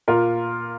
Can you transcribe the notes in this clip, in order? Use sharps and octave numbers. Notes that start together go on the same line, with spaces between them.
A#2 F4 A#4